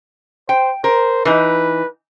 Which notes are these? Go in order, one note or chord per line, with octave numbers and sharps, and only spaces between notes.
C5 G5
A#4 C5
E3 D#4 B4